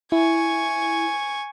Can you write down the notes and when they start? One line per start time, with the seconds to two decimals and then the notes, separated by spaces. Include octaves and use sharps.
0.12 E4 G#5 C#6